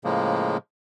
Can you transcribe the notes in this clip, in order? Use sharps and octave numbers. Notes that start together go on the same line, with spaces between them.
A2 C#3 F3 G#3 A#3